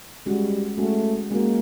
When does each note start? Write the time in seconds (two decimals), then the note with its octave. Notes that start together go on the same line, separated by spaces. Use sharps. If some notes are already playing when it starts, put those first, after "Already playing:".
0.26 G3 G#3 C#4 F#4
0.78 G#3 A3 C#4 F#4
1.31 G#3 A#3 C#4 F#4